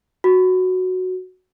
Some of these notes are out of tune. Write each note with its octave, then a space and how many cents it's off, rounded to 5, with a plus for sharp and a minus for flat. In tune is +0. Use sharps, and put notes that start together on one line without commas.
F#4 -5